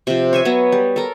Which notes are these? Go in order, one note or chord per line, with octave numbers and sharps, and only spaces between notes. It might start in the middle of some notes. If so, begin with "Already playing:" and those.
C3 F3
C#5 E5 G#5
F#3 B3 C#6
G3
A4 A#4